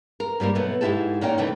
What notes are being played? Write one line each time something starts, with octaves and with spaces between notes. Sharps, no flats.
A#4
G#2 G3 A#3 A#4
B2 F#3 A3 B3
G#2 G#3 E4 F4 G4 A4
A#2 C#4 D#4 A#4 G5
C3 D#3 E3 A3